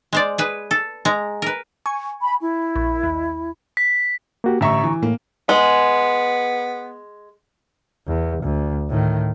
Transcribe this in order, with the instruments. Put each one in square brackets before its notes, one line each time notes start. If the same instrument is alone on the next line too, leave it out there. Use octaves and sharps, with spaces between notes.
[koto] G#3 C5 D5
G#4 B4
A4
G#3 A#5
A#4 B4
[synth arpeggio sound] G#5 C#6
[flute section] B5
E4
[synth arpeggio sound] A#1
D#2
[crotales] B6
[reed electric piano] A#3 F#4 G4
[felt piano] A1 E5 [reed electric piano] D3 A#5 C#6
[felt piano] E3
[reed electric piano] A2 [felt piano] A#3
[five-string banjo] G#3 [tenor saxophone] B3
[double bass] E2
D2
A2 D#3